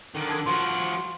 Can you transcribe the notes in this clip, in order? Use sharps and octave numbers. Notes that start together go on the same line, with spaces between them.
D3 D#3
A5 G#6
F3 F#4 C6